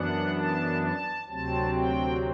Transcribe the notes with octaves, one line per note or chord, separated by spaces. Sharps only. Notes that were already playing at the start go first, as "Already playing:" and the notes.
Already playing: F#2 E3 B3 D4 F#5
A5
A5
D2 C3 F#3 C4 A5
G5